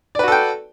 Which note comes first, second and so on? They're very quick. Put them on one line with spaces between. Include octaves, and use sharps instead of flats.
D5 B4 F#4 A4 G5